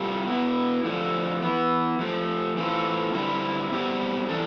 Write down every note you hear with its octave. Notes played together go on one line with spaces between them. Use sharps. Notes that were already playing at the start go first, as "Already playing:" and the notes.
Already playing: C3 G3 F4 A4
B2 B3 E4
F2 D3 F3 A3
E3 B3 E4
F3 A3 C4
E3 A3 C4 F4 A4
D3 G3 C4 E4
B2 G3 C4 G4
E3 G3 D4 A4